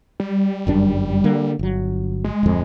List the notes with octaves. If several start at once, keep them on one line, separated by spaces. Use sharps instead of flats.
G3
G1 F#2 D4
D3 A#3
G1 F#3
G#3
D1 F2